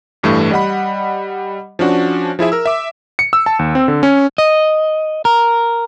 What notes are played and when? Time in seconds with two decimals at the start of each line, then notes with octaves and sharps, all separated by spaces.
0.23 A1 G2 E3 A3
0.51 G3 D#5 F#5 B5
1.79 F3 C#4 D4 F#4
2.39 F3 E4 G#4 E5
2.52 A#4 E6
2.65 E5 D6
3.19 C#7
3.33 E6
3.46 A5
3.59 D#2
3.75 C4
3.88 D3
4.03 C#4
4.38 D#5
5.25 A#4